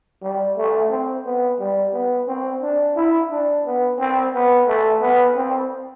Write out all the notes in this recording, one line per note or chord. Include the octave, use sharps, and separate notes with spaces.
G3
A3
C4
B3
G3
B3
C4
D4
E4
D4
B3
C4
B3
A3
B3
C4